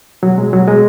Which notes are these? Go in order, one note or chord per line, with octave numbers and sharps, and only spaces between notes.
B2 F#3
B2 G#3
B2 F#3
B2 G#3